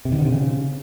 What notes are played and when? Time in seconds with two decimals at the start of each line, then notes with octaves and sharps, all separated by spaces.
0.05 C3
0.12 D#3
0.19 D3
0.25 C3
0.32 C#3